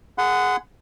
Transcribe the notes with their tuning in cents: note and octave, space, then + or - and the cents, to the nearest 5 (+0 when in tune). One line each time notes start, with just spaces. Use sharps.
G#4 +0 F#5 +0 C6 -45